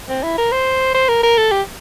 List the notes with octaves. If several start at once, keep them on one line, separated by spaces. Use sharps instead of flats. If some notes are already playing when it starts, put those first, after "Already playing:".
C4
E4
A#4
C5
C5
A#4
A#4
A4
G4